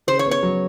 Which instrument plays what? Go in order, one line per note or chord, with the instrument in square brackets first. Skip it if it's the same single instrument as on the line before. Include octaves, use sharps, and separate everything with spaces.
[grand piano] C#3 [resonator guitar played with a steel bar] C5
[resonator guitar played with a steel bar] C#5
[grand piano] B3
[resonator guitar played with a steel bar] C#5
[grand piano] F#3